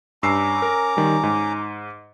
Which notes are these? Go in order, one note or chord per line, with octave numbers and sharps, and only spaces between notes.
G2 C#4 A#5 D6 E6 C7
A#4
D#3 G3
G#2